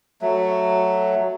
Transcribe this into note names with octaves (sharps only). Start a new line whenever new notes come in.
F#3 A3